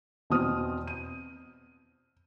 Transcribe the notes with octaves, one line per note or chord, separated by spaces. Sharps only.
E2 B2 C4 D#6 F6
D#7